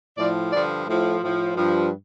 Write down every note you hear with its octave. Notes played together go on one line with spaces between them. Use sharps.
A2 F3 D5
G2 D3 F3 D5
A2 F3
A2 F3
G2 F3